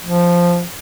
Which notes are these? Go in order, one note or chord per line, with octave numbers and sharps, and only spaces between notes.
F3